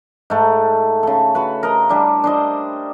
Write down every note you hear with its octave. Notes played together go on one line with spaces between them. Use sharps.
G#2 A3
C#3 A4
F#4 B4
A#4 D#5
G3 D4 E4
D4 C5 D#5